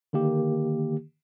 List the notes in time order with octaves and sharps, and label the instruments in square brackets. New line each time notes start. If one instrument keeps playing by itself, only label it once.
[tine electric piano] D3 D#3 A#3 G4